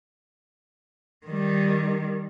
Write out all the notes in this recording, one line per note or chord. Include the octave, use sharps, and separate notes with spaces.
D#3 G3